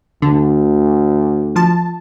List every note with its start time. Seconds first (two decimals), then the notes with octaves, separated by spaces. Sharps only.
0.22 D2 D3
1.56 F3 A5